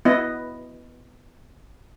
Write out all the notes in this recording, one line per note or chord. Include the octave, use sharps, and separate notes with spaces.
B3 E4 D#5